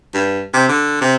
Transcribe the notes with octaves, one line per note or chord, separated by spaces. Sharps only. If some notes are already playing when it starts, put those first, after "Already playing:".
G2
C3
D3
C3